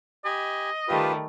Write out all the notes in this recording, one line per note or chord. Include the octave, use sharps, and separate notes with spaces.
G4 D#5 G#5 B5
D#3 G3 A3 F4 G4 B4